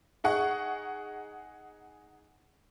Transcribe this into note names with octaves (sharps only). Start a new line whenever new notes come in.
D#4 G#4 F#5 C#6